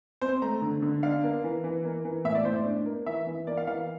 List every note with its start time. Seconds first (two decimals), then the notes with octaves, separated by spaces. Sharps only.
0.21 C4 C5
0.42 A3 A#5
0.62 D3
0.82 D3
1.03 D4 F5
1.24 A#3
1.44 E3
1.64 E3
1.85 A#3
2.05 E3
2.24 A2 E5
2.35 D5
2.45 A2 C5
2.56 D5
2.66 D4
2.86 A#3
3.06 E3 E5
3.27 E3
3.47 A#3 D5
3.57 F5
3.67 E3 F5